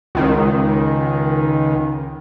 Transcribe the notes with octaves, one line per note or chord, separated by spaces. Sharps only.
C#2 D#3